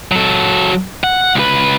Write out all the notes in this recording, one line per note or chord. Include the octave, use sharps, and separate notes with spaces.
F#3 A4
F#5
C#2 B4